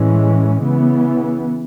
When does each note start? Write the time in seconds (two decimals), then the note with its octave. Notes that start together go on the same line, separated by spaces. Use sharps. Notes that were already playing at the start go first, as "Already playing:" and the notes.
Already playing: A2 E3 G#3 C#4
0.61 C#3 E3 B3